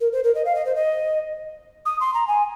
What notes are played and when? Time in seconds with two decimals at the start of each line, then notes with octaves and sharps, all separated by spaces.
0.01 A#4
0.12 C5
0.24 A#4
0.35 D#5
0.45 F5
0.55 D#5
0.65 C5
0.75 D#5
1.86 D#6
2.00 C6
2.14 A#5
2.28 G#5